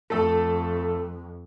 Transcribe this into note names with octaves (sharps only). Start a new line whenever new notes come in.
F2 A3 A4